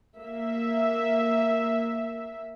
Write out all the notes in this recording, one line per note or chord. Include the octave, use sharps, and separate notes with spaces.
A#3 E5